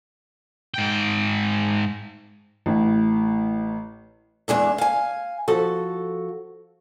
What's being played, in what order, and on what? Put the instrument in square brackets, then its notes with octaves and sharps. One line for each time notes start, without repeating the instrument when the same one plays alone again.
[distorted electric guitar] G#2 G5
[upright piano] A1 A2
[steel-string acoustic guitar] E2 G#3 D4 E5
F5 G#5
F3 F#4 A4